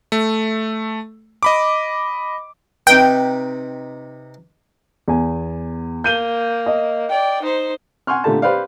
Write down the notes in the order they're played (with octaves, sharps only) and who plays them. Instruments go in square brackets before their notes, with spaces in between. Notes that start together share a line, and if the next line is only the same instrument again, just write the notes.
[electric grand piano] A3
D#5 B5 D6
[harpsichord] C3 D#4 B4 [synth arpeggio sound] G5
[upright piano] E2 G#5
[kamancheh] A#3 [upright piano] G6 D#7 G7
[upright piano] D#5
[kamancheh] D5 G5
D#4 C5
[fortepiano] F#5 G#5 C6 C#6 F6
A#2 D3 A3 G4 A5
G4 B4 C5 D5 F5